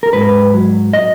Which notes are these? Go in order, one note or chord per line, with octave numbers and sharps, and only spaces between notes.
A#4
G#2 B4
F#3
D#5